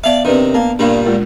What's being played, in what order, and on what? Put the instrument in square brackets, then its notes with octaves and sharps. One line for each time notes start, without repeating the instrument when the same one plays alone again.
[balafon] B3 E5 [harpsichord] D5 F5
[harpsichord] C3 D#3 [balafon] D4 B4 D5
[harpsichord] A#3 [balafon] B3
[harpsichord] G2 A#2 G3 [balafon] D4
[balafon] G#3 F4 A#4